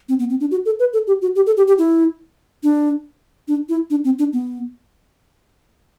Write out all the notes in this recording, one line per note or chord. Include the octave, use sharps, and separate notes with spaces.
C4
B3
C4
D4
F#4
A4
B4
A4
G4
F#4
G4
A4
G4
G4
E4
D4
D4
E4
D4
C4
D4
B3